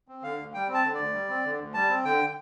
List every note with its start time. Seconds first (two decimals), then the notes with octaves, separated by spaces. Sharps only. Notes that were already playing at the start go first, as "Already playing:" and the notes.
0.08 C4
0.23 D3 F5
0.38 D2
0.54 G3 G5
0.68 C4
0.74 A5
0.84 D3
0.94 D2 D5
1.14 G3
1.29 C4
1.45 D3
1.60 D2
1.74 G3 A5
1.89 C4
2.05 D3 G5